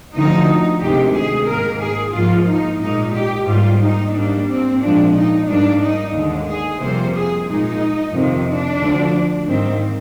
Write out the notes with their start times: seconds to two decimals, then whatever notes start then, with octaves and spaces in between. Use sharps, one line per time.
0.14 D2 D3 F3 D#4
0.81 D2 C3 D#3 G#3 G4
1.14 G#4
1.47 G#2 D#3 A#3 A#4
1.81 G#4
2.14 G#2 F3 A#3 F4
2.47 D#4
2.81 A#2 G#3 D#4
3.15 G4
3.47 G#2 G3 A#3 F4
3.80 D#4
4.14 G#2 G3 A#3 D4
4.48 C4
4.81 A#2 F3 G#3 D4
5.14 D#4
5.47 G#2 G3 A#3 D4
5.81 D#4
6.13 D#2 D3 G#3
6.48 G#4
6.80 F2 C3 G3 A#3 C5
7.15 G#4
7.47 A#2 G#3 D#4
8.13 F2 C3 D#3 A#3
8.48 D4
8.81 D2 D3 F3
9.47 G#2 D#3 G3 A#3 C4